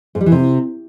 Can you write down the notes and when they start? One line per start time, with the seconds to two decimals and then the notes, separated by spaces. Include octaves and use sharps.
0.15 G#2
0.21 G3
0.26 E3
0.32 C3